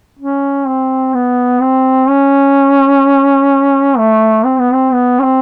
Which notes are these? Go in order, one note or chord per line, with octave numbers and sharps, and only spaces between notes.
C#4
C4
B3
C4
C#4
A3
C4
B3
C4
B3
C#4
C4